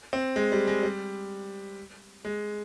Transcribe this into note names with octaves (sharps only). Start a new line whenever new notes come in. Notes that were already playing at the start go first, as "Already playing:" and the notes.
C4
G#3
G3
G#3
G3
G#3